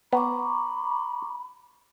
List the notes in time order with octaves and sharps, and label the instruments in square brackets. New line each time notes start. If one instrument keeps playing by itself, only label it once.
[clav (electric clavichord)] B3 [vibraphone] A#5 C#6 D6 [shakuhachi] B5